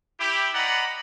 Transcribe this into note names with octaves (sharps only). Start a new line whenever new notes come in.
E4 G4
D5 D#5 F#5 A#5 B5